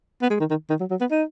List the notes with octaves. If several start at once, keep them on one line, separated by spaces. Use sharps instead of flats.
B3
G#3
D#3
D#3
D#3
F#3
F#3
B3
D#4